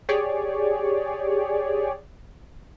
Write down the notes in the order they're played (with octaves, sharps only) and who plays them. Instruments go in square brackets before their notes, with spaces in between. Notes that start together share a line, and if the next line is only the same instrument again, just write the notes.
[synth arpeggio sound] G4 G#4 C#5 D5